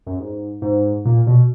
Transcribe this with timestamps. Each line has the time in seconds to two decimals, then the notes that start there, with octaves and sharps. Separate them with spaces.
0.06 F#2
0.19 G#2
0.62 G#2
1.05 A#2
1.27 B2